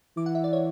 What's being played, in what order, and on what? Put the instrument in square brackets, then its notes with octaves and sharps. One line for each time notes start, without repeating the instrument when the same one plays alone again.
[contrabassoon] E3 [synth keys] D6
[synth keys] F#5
E5
D5
C#5